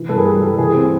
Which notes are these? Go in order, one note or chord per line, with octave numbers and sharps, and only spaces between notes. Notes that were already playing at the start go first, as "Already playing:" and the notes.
Already playing: E3
G2 A4 B4
G#4 A#4
G3 A4
G3 A4
E3 G#4
C4